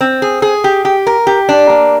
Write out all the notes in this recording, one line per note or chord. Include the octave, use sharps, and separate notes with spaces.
C4
G#4
G#4
G4
G4
A#4
G4
D4
A#3